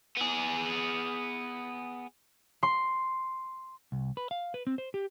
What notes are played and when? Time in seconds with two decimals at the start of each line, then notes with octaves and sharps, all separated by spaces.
0.17 B3 G#4
2.63 C6
3.92 C2
4.17 B4
4.31 F5
4.54 B4
4.67 C4
4.78 C5
4.94 G4